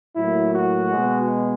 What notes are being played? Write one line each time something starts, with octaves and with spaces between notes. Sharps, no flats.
A2 F#3 A#3 E4
F#4
B2 G#3